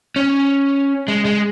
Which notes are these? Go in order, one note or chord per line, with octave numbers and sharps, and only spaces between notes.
C#4
G#3
G#3